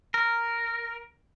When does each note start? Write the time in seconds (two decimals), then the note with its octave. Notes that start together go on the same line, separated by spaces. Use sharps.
0.14 A#4